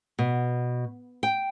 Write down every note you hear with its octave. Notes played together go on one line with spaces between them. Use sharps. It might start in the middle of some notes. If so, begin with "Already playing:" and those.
B2
G5